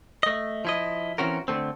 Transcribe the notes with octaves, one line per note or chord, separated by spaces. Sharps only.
A3 D#5
F3 E4 D#5
E3 G#3 C4 C#4 F#4 A#4
D3 A3 C4